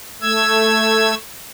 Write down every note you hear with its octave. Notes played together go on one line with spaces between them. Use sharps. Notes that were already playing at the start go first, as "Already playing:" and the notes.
A3 E6 G#6